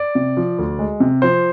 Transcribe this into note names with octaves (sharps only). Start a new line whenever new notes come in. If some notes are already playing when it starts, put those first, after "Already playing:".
Already playing: D5
C3
F3
D2
G#3
C3
F3 C5